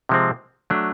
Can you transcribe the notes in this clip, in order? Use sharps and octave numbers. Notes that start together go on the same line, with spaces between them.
C3 F3 G#3 C4
F#3 A3 D4